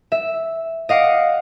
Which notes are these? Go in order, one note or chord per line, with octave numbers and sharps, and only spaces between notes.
E5
D#5 F5 F#5 D6